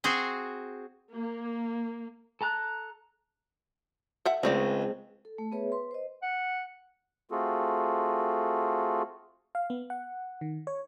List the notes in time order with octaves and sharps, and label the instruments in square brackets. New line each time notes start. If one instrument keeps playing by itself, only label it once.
[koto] C4 F#4 G#4 C5
[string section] A#3
[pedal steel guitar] A4 A5 A#5 F#6
[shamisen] A4 E5 F#5
[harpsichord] C#2 [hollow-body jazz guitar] G#3 C4 [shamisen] A3 C#5 D5
[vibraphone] A4
A3
B3 G#4 B4 C#5 E5
B4 C6
C5 D#5
[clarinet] F#5
[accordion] A3 C4 F4 F#4 G#4 A4
[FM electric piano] F5
B3
F#5
D#3
C#5